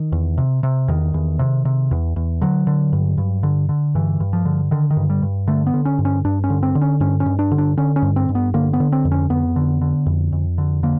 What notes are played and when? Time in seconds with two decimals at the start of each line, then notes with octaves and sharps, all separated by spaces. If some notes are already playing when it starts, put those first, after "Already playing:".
Already playing: D#3
0.12 E2
0.38 C3
0.63 C3
0.88 E2 D#3
1.14 E2
1.39 C3
1.65 C3
1.91 E2
2.16 E2
2.41 D3 F#3
2.67 D3
2.93 G2
3.18 G2
3.43 D3
3.69 D3
3.95 G2 E3
4.20 G2
4.33 F3
4.45 D3
4.71 D3 D#3
4.90 D#3
4.97 G2
5.10 G3
5.22 G2
5.47 D3 A3
5.67 B3
5.74 D3
5.85 C#4
5.99 G2
6.05 C#4
6.25 G2 D4
6.44 C#4
6.50 D3
6.63 C4
6.75 D3
6.81 C#4
7.00 G2 C#4
7.20 C#4
7.26 G2
7.39 D4
7.51 D3
7.58 D4
7.77 D3 C#4
7.96 C#4
8.02 G2
8.16 C4
8.29 G2
8.35 B3
8.54 D3 A#3
8.73 B3
8.80 D3
8.92 C4
9.05 F2
9.12 C#4
9.30 F2 B3
9.56 D3
9.81 D3
10.06 F2
10.33 F2
10.58 D3
10.83 D3 A#3